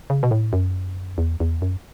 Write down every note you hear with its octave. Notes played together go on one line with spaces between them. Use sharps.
C#3
B2
A2
F#2
E2
E2
F#2